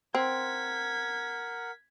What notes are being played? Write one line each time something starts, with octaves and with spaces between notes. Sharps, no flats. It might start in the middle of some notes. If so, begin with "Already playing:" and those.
C4 A#4 F#5 G#6 B6